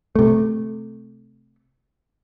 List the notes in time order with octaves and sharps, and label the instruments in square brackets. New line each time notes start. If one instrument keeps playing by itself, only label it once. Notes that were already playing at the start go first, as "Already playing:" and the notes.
[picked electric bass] C3 A3